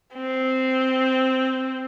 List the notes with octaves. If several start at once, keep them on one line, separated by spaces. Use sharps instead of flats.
C4